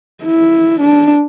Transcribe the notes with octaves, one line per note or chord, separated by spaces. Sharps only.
E4
D4